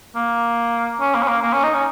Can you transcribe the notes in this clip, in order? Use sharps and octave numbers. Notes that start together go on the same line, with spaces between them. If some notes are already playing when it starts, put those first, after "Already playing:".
A#3
C#4
A#3
C#4
A#3
A#3
C#4
D#4
C#4